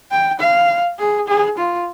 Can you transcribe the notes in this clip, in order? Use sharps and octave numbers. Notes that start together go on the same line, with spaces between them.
G5
F5
G#4
G#4
F4